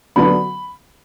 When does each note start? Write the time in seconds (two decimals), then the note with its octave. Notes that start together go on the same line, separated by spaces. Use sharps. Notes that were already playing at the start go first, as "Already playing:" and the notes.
0.16 D3 F#3 B3 D4 B5